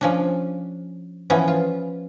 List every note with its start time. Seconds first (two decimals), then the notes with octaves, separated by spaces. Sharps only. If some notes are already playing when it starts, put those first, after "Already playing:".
0.01 F3 C#4 D4
1.30 E3 F3 B3 C#4
1.48 F4